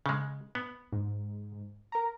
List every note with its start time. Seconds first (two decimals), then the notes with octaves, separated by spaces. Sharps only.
0.06 C#3 G#3
0.55 B3
0.93 G#2
1.92 A#4 A#5